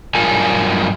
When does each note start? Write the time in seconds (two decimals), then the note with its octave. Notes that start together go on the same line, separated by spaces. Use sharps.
0.15 G2 F#3 F4 A#4 G#5 A5